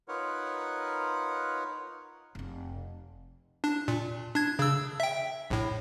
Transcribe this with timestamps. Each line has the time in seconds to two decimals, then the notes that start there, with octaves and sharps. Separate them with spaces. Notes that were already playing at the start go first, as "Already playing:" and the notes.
0.08 D#4 F4 A#4 B4 C#5 F#5
2.35 F1 C4
3.64 D4
3.88 A#2
4.35 D4 G#6
4.59 C#3 E6
5.00 E5 G5
5.50 A#1 A2